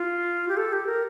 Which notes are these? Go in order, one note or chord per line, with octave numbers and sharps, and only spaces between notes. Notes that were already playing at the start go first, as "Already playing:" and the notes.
Already playing: F4
G4
A4
G4
A#4